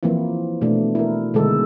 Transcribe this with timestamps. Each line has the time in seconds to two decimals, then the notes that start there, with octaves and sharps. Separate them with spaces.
0.03 E3 F3 A#3 C4 E4
0.61 B2 A3 D4
0.95 E4 A#4
1.34 B2 D3 D#3 G#3 A4